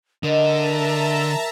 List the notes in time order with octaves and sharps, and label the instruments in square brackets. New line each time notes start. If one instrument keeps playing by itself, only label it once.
[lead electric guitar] D3 [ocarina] A#4 [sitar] D#5 [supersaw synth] E5 A5 A#5